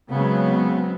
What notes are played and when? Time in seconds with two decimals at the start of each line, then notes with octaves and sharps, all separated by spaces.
0.11 C#3 F#3 G#3 B3 C4